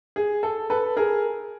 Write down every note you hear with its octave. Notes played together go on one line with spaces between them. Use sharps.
G#4
A4
A4 B4
G#4 A#4